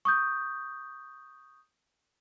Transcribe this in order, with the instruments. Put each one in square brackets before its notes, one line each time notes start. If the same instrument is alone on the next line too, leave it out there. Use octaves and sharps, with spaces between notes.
[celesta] C#6 D#6 G6